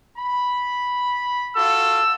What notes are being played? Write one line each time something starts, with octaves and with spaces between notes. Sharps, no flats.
B5
F4 F#4 A4 E6